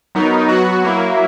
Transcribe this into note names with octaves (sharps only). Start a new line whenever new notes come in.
F#3 B3 D#4 A#4
F#3 B3 F#4
F#3 A#3 E4